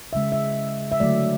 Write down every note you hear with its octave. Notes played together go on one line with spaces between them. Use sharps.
C#3 G#3 E5
E5
E5
D3 F#3 A3 D5